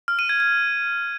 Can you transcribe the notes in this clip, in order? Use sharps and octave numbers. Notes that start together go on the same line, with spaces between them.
F6
D#7
G#6
G#6